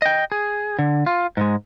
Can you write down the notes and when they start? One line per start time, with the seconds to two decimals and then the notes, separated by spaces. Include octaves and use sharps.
0.02 D#5 G5
0.32 G#4
0.79 D3
1.06 F4
1.37 G#2 G#3